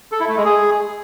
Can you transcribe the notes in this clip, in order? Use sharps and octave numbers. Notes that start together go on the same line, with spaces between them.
A4
E4
A3
G#3
G#4